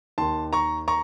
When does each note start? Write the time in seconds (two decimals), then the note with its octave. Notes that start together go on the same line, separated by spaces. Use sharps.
0.18 D#2 D#3 A5 C6
0.53 A#5 C#6
0.88 A#5 C#6